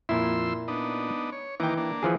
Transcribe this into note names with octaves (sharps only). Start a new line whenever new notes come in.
F2 A#2 E4 C6 E6
B3 D4 D#4
C#5
D#3 E3 A#3 G5 D6
A#3 D4
E3 F3 G#4